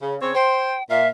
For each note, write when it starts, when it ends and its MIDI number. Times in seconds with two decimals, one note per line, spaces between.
0.01 0.15 49
0.21 0.34 49
0.21 0.34 60
0.21 0.34 73
0.35 0.74 72
0.35 0.83 79
0.90 1.08 46
0.90 1.08 76
0.90 1.08 77